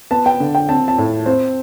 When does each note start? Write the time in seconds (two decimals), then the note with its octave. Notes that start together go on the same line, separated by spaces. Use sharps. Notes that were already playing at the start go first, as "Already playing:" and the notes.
0.11 B3 A5
0.26 G5
0.40 D3
0.55 G5
0.69 C4 A5
0.88 A5
0.98 A2
1.26 C4 C5